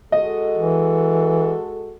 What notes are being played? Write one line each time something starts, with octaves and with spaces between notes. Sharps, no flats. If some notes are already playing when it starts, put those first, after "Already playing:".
G#3 F#4 A4 D#5
E3